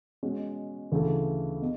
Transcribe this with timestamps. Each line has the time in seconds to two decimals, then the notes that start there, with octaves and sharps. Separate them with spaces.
0.23 B2 G#3 C#4 F#4
0.92 D2 C#3 E3 A3
1.62 B2